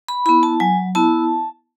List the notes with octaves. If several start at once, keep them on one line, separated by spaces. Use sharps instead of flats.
B5
B3 E4 B5
A5
F#3 G#5
B3 E4 A5